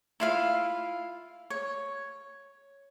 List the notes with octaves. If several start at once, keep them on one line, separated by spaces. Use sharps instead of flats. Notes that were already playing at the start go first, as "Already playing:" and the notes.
E4 F4 F5
C#5